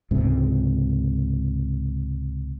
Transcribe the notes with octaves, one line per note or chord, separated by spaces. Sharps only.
C#2 G#2 C3